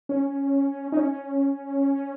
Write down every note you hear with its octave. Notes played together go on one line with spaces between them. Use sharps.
C#4
D#4
C#4